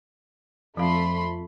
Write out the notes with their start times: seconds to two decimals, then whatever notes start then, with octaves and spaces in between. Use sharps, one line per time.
0.77 F2 F3 A3 F5 B5 C6